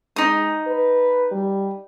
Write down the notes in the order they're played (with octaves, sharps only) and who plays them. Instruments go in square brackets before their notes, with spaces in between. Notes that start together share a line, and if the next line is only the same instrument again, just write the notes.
[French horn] G#3 [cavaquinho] D#4 D#6
[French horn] B4
G3